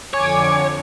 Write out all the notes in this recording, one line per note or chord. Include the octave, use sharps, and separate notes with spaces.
F2 D3 C#5 G#5 D6 G#6